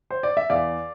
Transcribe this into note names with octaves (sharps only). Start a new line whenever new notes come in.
C5
D5
E5
E2 D5 F5